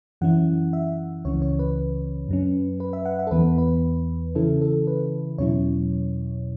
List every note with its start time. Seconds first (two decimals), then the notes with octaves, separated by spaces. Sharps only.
0.21 F#2 E3 C#4 E4 F#5
0.73 E5
1.25 C#2 C#3 E3 C#4 C#5
1.42 C#5
1.59 B4
2.28 F#2 F#3 C#4
2.80 B4
2.93 E5
3.05 F#5
3.19 E5
3.27 A4
3.31 E2 E3 B3 B4
3.58 B4
4.35 C#3 E3 C#4 E4 A4
4.61 A4
4.87 B4
5.38 E2 B2 F#3 C#4 E4 C#5